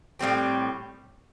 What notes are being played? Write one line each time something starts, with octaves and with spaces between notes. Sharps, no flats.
A2 G3 C4 G4